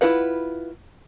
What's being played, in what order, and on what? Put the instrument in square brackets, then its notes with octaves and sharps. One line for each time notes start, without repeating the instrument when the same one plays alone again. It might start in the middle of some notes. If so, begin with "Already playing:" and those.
[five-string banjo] E4 F4 B4 F#5